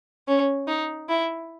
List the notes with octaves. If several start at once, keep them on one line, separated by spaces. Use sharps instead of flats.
C#4
D#4
E4